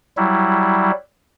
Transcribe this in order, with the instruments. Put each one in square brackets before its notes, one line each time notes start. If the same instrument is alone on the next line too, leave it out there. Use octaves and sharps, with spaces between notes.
[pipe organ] F#3 G3 E4